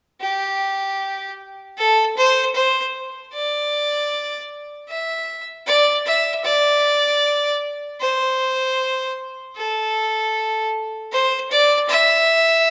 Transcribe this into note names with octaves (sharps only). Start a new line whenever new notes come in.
G4
A4
C5
C5
D5
E5
D5
E5
D5
C5
A4
C5
D5
E5